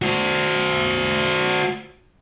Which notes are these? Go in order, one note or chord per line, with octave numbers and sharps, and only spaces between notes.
F#4 C5